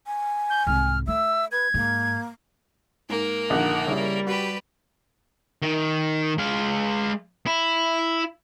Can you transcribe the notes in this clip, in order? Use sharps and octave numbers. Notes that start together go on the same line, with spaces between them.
G#5
G6
C2 G#2 F6
A3 E5 E6
B4 G#6
G#2 A#3
G#2 A#3 A#4
A#1 D3 D#3 F#5
C#3 G3 E4
F#4 G4 B4
D#3
G#3 F5
E4